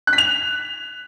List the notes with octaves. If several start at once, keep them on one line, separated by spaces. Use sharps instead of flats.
F#6
B6
F7